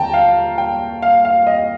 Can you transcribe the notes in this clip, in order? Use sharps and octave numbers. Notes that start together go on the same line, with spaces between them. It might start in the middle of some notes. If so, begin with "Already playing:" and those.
Already playing: D#2 D3 G5 A5 A#5
F5
G5
F5
F5
D#5